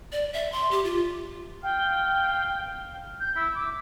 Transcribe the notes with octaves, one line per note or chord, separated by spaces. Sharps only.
D5
E5
C6
G4
F4
F5 G5
G6
E4 E6
D6